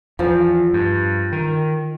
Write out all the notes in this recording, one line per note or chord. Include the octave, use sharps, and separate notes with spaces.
E2 F3
G2
D#3